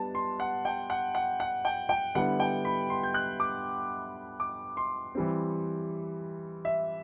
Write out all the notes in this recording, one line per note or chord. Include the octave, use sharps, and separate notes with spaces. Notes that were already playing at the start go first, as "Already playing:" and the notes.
Already playing: G3 B3 D4 A5
C6
F#5
G5
F#5
F#5
F#5
G5
G5
D3 G3 B3 E4 F#5
G5
B5
C6
G6
F#6
D6
D6
C6
E3 G3 C4
E5